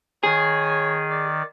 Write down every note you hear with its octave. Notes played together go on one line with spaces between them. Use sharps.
D#3 G#4 C#5
D5